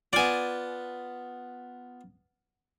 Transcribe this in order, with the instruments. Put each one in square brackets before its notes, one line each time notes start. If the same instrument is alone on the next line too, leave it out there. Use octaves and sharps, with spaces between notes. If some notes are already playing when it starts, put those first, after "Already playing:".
[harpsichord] B3 F4 [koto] D5 G#5